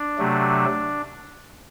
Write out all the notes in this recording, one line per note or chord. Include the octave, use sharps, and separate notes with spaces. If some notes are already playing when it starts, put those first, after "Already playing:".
Already playing: D4
C3 F#3 A3